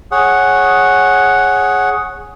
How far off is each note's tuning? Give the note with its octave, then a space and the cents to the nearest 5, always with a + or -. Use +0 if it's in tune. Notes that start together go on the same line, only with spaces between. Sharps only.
G#4 +5 C#5 -10 F#5 +0